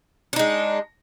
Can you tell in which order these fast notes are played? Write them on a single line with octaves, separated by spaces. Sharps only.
D4 D#4 G#3